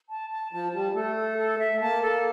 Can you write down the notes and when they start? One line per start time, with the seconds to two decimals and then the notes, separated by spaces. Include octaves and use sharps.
0.10 A5
0.30 A5
0.52 F3 A5
0.73 G3 A5
0.94 A3 A4
1.16 A4
1.38 A4
1.59 E5
1.73 A3
1.80 A#3 A5
2.02 A4